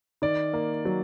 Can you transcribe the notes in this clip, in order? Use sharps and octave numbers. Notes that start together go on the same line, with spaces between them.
D#3 D5
A#3
F#3